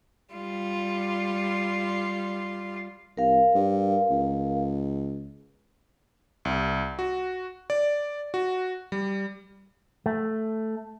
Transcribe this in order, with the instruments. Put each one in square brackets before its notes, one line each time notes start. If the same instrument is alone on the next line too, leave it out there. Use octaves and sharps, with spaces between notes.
[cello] G3 F4
[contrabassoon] C2 [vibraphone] A#4 F5
[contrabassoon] G2
C#2
[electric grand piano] C2
F#4
D5
F#4
G3
[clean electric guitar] A3